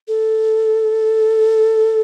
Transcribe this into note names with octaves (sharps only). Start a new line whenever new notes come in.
A4